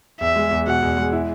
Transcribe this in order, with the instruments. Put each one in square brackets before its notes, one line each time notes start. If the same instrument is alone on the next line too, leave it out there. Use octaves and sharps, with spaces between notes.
[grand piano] E2 [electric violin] E5
[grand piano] G#3
E2
[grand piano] B2 [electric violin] F#5
[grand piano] E2
G#3
E4